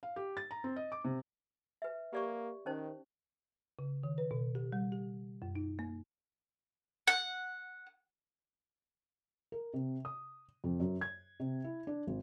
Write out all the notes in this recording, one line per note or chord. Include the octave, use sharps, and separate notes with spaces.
F5
G4
A6
A#5
C4
D#5
D6
C3
B4 E5
A#3 G4 D5 C#6
D#3 C#4 D#4 C5
C#3
D#3
B4
B2
G4
G3
G4
F#2
D#4
A#3
F#5
A#4
C3
D#6
F2
F#2
G#6
C3
E4
D4
G#1